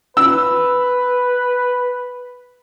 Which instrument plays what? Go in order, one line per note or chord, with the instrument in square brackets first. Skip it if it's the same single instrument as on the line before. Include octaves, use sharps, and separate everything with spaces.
[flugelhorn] B4 [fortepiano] E6